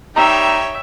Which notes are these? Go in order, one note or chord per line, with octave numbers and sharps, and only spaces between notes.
G3 D#4 C#5 E5 G5 A#5